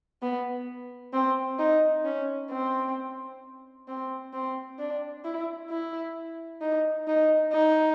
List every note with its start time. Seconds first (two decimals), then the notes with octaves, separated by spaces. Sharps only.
0.22 B3
1.13 C4
1.59 D#4
2.05 C#4
2.50 C4
3.88 C4
4.34 C4
4.79 D4
5.25 E4
5.70 E4
6.62 D#4
7.08 D#4
7.53 D#4